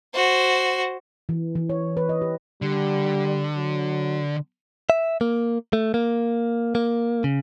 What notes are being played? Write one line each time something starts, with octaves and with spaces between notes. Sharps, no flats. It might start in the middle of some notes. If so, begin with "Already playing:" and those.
F#4 C5
E3
E3
C#5
B4
D#5
G4
D3 G3
F#3
E5
A#3
A3
A#3
A#3
C#3